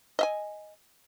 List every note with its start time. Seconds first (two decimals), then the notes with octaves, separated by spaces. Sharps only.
0.19 D#5 E5 G#5